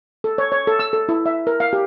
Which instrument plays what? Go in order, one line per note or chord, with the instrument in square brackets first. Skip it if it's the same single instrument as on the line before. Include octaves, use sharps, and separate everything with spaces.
[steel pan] A4
C#5
C#5
A4
E6
A4
E4
E5
A#4
F5
G4